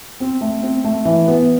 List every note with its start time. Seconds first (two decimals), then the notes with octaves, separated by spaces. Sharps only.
0.20 C4
0.41 A3
0.63 C4
0.84 A3
1.05 E3
1.27 B3